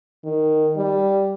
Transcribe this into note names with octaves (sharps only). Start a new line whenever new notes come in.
D#3
G3